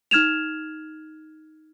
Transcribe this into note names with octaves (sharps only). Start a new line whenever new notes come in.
D#4 F6 G#6 E7 F7